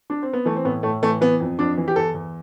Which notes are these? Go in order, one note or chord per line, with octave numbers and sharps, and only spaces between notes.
D4
C4
B3
E3 A3
C4
A2 B3
A2 A3
E3 A3
E3 B3
F2
F2 D4
E3
G4
E2 A4
E2